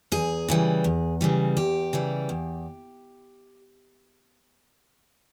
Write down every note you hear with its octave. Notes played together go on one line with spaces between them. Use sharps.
E2 G#4
C#3 E3 G3
E2
C#3 E3 G3
E2 G4
C#3 E3 G3
E2